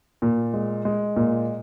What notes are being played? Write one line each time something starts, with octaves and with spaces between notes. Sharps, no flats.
A#2
G#3
G#3
A#2